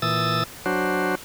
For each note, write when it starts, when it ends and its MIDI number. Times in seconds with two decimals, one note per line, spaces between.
0.02 0.44 46
0.02 0.44 52
0.02 0.44 87
0.02 0.44 88
0.02 0.44 93
0.66 1.15 54
0.66 1.15 62
0.66 1.15 66
0.66 1.15 72